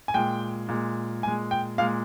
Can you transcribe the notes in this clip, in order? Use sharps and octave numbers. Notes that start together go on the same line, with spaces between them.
G#5
A#2 G#3 G5
A#2 G#3
A#2 G#3 G#5
G5
A#2 G#3 F5